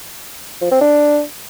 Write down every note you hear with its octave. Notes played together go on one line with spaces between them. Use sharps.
F3
C4
D4